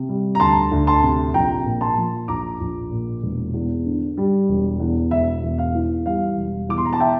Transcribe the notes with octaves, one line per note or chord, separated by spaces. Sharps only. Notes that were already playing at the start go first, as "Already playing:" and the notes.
Already playing: C3
G3
A#5
D2 A5 C6
D2
A5 C6
C3
A#1 G5 A#5
A#2
A5 C6
F3
A#1 A#5 D6
A#1
A#2
E1
E2
D3
G3
E1
E2
E1 E5
E2
F5
E3
G3 F5
E1
E2 D6
C6
A#5
A5
E5 G5